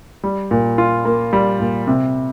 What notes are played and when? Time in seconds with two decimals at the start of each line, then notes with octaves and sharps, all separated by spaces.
0.24 G3
0.51 A#2
0.78 F4
1.05 A#3
1.33 G3
1.60 A#2
1.87 C3